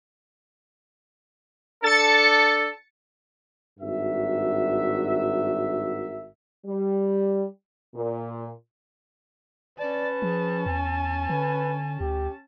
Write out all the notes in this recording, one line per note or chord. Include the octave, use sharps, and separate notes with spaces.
D4 A4 A6 C#7
G#1 G2 F#4 A#4 E5
G3
A#2
C#4 B4 D5 A5
F3 G#4
E2 G#5
D3 B4
D2 G4